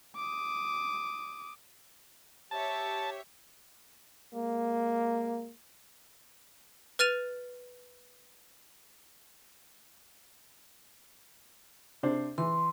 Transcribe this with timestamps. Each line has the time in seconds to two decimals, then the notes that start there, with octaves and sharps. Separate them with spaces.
0.16 D6 D#6
2.51 G4 C#5 E5 A5
4.34 G#3 A#3
6.99 B4 F6 A6 D#7 F7
12.03 C3 D4 C5
12.38 E3 C6